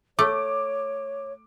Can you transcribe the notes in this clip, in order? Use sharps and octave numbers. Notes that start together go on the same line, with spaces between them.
A3 C#5 D6